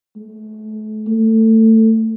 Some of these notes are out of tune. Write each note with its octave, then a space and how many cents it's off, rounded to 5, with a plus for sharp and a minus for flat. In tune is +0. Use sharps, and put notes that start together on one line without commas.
A3 -35
A3 +20